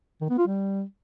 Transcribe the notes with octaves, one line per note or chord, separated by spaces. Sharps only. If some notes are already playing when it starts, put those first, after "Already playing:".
D#3
B3
F4
G3